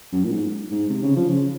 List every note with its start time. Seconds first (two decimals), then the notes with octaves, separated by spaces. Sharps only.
0.13 F#2
0.25 A#2
0.32 G#2
0.71 G#2
0.90 C3
1.03 C#3
1.16 F3
1.29 C#3